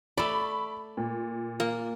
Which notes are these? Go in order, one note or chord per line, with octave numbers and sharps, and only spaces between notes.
A3 D5 B5
A#2
A#3